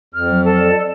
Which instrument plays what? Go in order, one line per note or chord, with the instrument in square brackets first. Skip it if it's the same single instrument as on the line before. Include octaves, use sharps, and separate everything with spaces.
[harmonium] F2 [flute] F6
[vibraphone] F#3
[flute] A4
[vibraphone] D5